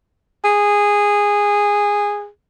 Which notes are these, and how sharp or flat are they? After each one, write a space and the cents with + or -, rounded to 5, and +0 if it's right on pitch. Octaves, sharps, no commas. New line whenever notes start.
G#4 -15